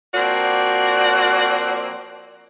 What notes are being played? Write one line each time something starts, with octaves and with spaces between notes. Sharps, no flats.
F3 A#3 C4 F#4 D5